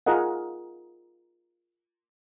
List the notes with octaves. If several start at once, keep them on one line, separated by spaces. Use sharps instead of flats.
F4 G#4 A#4 D#5 F#5